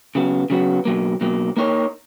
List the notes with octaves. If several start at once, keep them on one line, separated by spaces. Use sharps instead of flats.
C#3 F#3 B3
C#3 F#3 B3
B2 F#3 A#3
B2 F#3 A#3
A#3 D#4 A#4 C#5